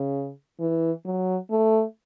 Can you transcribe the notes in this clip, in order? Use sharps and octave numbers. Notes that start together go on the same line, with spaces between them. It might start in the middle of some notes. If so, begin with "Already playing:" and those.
Already playing: C#3
E3
F#3
A3